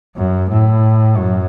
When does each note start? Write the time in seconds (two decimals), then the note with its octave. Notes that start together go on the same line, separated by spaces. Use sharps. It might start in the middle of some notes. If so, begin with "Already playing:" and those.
0.16 F#2
0.49 A2
1.16 F#2